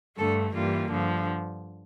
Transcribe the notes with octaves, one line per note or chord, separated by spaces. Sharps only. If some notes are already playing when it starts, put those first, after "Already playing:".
G2 D3 A3 A4
G2 E3 G3 A#3 F4
G2 D3 F3